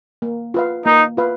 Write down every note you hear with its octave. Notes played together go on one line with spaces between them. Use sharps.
A#3
F4 B4 F5
A#3 D#4
F4 B4 F5